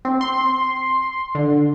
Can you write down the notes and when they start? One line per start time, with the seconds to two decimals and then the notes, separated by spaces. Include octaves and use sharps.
0.05 C4
0.21 C6
1.35 D3